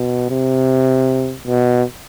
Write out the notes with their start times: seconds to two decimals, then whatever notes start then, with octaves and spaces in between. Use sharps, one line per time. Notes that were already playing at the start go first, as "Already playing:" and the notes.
Already playing: B2
0.30 C3
1.47 B2